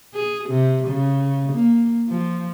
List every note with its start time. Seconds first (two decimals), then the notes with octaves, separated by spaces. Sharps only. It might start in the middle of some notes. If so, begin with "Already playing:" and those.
0.14 G#4
0.49 C3
0.87 C#3
1.52 A#3
2.09 F3